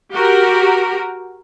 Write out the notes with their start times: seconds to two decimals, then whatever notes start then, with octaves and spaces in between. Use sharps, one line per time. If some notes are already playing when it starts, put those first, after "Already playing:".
0.12 F#4 G4 A#4